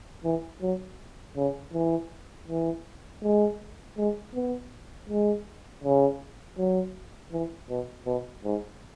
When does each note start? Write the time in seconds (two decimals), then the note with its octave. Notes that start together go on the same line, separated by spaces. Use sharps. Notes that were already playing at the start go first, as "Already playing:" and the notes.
0.25 E3
0.61 F#3
1.37 C#3
1.73 E3
2.48 E3
3.23 G#3
3.97 G#3
4.34 B3
5.09 G#3
5.84 C#3
6.58 F#3
7.32 E3
7.70 B2
8.06 B2
8.44 G#2